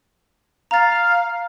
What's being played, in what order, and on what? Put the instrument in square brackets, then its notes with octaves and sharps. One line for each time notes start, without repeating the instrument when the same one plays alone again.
[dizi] F5 [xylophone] A#5 A6